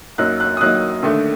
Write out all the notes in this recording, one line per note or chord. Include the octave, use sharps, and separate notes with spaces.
F#2 F#3 A#3 D#4 F#6
F#6
D#6
F#2 F#3 A#3 D#4 F#6
D#2 D3 A3 D4